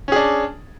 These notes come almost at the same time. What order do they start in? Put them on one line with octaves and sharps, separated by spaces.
C#4 G#4 D4